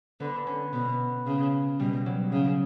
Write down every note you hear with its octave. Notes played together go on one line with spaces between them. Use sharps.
D3 B3
C#4
B2 B3
C#3
B2 G3
F#3
C#3